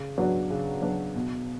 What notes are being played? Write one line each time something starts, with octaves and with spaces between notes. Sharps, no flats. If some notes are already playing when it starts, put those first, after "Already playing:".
Already playing: C#3
F#3 B3 D4 F#4
C#3
F#3 B3 D4 F#4
B2